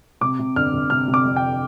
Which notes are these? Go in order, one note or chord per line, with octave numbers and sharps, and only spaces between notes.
C3 D6
C3
G1 F6
G1
C3 F6
C3
D6
F2
G5